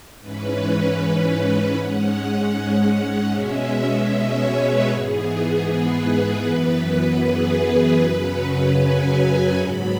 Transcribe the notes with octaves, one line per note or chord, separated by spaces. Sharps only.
G#2 E3 C#4 B4
G#2 G#3 C#4 F#5
B2 G#3 C#4 E5
C#5
B4
G#2 E3 B3 G#4
B4
F#2 E3 B3 B4
G#4
F#2 C#3 F#3 C#4 B4
G#5
G#2 F#3 B3 B5